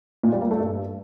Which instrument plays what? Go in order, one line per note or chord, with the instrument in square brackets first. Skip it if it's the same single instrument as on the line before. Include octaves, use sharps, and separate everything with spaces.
[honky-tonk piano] A#2
G3
A#3
A3
G2